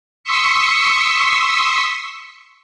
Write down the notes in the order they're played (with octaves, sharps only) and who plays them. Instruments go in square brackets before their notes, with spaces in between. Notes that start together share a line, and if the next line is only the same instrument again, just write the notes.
[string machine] C6 C#6 D#6 E6 B6 C#7